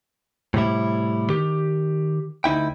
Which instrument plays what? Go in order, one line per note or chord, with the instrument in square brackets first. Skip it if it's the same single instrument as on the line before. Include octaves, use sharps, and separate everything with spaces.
[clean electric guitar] A2 C3 G3 E4
D#3 G4
D2 D#4 E4 G5